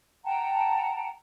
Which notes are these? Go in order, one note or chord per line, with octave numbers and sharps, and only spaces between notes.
F#5 G5 A5 A#5